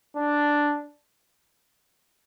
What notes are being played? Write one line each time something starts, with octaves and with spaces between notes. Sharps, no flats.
D4